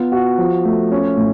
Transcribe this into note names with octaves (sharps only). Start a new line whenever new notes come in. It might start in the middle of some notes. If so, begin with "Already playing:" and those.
Already playing: B3 F4
F#4
F3
A3
C#4
A2